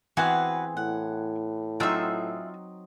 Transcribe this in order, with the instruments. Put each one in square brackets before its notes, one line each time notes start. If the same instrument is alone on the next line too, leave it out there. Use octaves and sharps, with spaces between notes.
[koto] E3 B3 C4 [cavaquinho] F#4 B4 F#5 [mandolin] G#4
[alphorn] A2 [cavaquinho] F#5
[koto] F#3 C4 D#4 [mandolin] F4 E6 [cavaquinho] G#4 E5